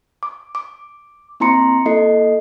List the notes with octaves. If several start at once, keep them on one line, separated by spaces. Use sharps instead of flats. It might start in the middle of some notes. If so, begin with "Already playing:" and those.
D6
D6
A#3 C4 E4 A#5 C6 C#7
A#3 E4 A4 D#5 C7